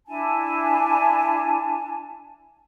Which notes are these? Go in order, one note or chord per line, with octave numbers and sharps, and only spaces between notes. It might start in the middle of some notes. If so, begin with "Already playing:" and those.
D4 E4 G#5 A5